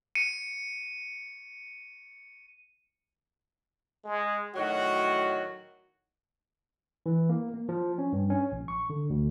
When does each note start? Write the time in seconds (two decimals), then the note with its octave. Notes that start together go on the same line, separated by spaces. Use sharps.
0.15 C#7 D#7
4.04 G#3
4.55 A2 D#3 F#3 F#4
7.06 E3
7.29 A#3
7.54 A#3
7.69 F3
7.98 C#4
8.13 G2
8.30 C#4
8.52 A#1
8.68 C#6
8.90 D3
9.10 D2